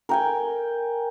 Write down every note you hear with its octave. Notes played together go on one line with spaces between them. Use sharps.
A#4 G5 G#5